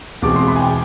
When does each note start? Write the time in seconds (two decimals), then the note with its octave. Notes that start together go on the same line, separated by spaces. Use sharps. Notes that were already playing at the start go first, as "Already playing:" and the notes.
0.22 E2 B2 G#3 C4 D6
0.36 C6
0.47 B5
0.56 G#5
0.60 G5